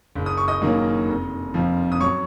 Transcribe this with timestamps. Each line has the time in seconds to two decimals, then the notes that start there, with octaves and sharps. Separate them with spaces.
0.15 F#1
0.26 D#6
0.37 C#6
0.48 D#5 D#6
0.62 F#2 D#3 A#3 C#4
1.08 F1
1.54 F2 F3
1.92 D#6
2.01 F#2 C#5 C#6